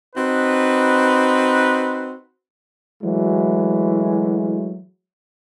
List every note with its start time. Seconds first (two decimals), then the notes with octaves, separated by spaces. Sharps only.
0.16 C4 D#4 F#4 B4
3.03 E3 F#3 G#3 A3 E4 F#4